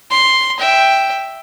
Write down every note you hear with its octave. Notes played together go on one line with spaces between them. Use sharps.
C6
E5 G5